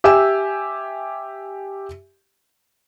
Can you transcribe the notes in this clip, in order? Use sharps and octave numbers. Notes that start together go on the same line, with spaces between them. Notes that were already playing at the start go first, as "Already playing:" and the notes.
G4 E5 G#5 E6